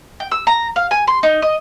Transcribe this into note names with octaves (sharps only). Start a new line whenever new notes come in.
G5
E6
A#5
F5
G#5
C6
D#4
D#5